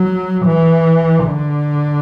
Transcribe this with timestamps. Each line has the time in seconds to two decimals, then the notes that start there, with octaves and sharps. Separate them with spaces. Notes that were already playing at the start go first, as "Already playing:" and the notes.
Already playing: F#3
0.45 E3
1.26 D3